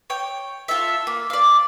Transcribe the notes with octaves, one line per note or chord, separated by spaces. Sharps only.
C#5 G5
F4 A4 E5
A#3
D5 F5